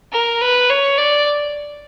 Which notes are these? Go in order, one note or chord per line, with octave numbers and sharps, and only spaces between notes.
A#4
B4
C#5
D5